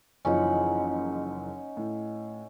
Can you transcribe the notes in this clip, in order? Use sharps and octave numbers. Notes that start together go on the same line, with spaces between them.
F#1 E3 F3 C#4 D#4 F#5
A2